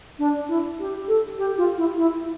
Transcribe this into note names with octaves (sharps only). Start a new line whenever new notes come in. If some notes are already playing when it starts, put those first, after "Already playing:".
D4
E4
G4
A4
G4
F4
E4
E4